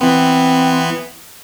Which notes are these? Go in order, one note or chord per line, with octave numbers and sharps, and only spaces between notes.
E3 B3 C4